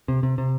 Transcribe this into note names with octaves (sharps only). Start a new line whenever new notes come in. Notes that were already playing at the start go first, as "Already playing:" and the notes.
C3
C3
C3